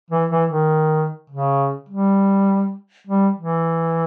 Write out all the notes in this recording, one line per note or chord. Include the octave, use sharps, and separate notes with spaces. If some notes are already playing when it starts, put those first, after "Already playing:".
E3
E3
D#3
C#3
G3
G3
E3